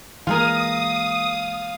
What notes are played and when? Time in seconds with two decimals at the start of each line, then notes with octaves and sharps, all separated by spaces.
0.27 E3 G#3 A#3 F4 G#4 A#4 F5 D#6